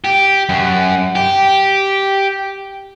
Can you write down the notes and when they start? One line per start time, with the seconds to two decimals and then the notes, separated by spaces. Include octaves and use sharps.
0.04 G4
0.49 F#2
1.15 G4